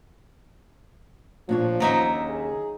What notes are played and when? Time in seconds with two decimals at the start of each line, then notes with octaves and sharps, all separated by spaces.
1.49 A#2 F3 D4 C#5
1.80 D#2 C#3 F#3 D#4 E5
2.29 G#4